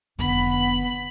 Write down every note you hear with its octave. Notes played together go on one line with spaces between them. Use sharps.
F1 D3 B3 B5